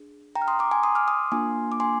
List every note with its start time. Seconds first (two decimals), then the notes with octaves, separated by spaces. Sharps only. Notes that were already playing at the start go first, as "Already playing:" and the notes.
Already playing: D4 G#4
0.35 G5 A#5
0.42 F6
0.48 C6 D#6
0.59 A#5 D6
0.71 G#5 C6
0.83 C6 D#6
0.95 D6 F6
1.08 C6 D#6
1.32 A#3 D4 F4 G#5 C6
1.72 D6
1.80 G#5 C6